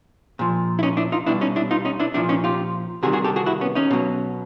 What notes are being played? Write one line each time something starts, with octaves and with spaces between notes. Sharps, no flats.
A#2 F3
E4
C#4 D#4
D4 E4
D#4 F4
B2 G3 D4 E4
C#4 D#4
D4 E4
D#4 F4
C#4 D#4
D4 E4
A#2 F3 D4 E4
C#4 D#4
F4 G4
C3 D#3 G3 F#4 G#4
F#4 G#4
G4 A4
F#4 G#4
E4 F#4
B3 C#4
C#4 D#4
B2 F#3